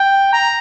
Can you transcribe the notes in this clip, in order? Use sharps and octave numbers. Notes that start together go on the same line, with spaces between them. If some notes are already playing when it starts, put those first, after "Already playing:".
Already playing: G5
A#5